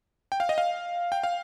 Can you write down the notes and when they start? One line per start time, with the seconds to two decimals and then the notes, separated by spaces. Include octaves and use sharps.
0.32 G5
0.40 F5
0.49 D#5
0.58 F5
1.12 G5
1.24 F5